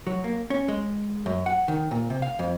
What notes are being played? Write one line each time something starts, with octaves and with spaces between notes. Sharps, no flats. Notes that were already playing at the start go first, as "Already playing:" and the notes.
F#3
A#3
C#4
G#3
F#2
F#5
D#3
A#2
C3
F5
F2